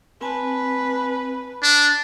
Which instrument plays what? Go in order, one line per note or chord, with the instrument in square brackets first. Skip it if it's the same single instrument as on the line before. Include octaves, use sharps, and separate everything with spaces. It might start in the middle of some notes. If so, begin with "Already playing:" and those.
[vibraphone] C4 G#5 A5 [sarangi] B4
[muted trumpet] D4 [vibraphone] A5